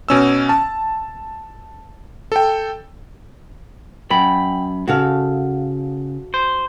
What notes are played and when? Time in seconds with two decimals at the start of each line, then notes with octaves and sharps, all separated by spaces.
0.09 B2 C#4 E6
0.49 A5
2.32 A4 G5
4.10 F#2 G5 B5
4.88 C#3 F#4 A4 F5
6.34 C5